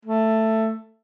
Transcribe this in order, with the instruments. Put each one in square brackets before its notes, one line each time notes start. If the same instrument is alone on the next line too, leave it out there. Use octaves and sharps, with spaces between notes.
[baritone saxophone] A3